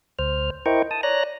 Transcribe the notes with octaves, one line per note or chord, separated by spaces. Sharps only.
D2 C5 F6
E4 A#4 C5 D#5 G5 C#6
A5 D#6
C#5 D5 A#5 F#6 A#6